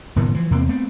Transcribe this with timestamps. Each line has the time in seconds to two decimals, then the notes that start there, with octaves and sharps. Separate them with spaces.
0.16 F#1 A2 D#3 B3
0.35 E3 F3
0.51 E2 C3 A#3 C4
0.69 A3 B3 C4